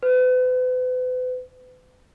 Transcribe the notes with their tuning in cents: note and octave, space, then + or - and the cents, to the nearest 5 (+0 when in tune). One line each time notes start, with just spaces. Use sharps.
B4 +40